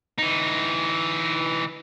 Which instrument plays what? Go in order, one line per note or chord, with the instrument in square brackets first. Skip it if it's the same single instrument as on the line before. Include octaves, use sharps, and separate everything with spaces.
[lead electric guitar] E3 D#4